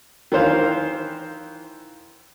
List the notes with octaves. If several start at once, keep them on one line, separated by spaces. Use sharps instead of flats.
D#3 E3 C5 F5